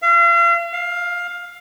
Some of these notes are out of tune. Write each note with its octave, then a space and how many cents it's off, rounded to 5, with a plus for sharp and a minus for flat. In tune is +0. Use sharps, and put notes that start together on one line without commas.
F5 -40
F5 +15